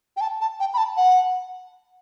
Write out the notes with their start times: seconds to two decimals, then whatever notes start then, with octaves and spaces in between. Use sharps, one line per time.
0.17 G5
0.21 A5
0.41 A5
0.60 G5
0.74 B5
0.78 A5
0.97 F#5